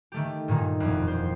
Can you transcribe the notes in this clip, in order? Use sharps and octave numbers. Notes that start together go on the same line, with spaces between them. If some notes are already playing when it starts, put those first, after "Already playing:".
D#3 A3 G4
G2 A#2 D#3 D#4
E1 F2
C5